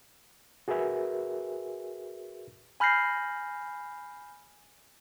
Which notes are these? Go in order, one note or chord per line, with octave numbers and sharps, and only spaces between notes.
F#4 G#4 A#4 B4 E5 G#5
G#5 B5 F6 G6 A#6 C7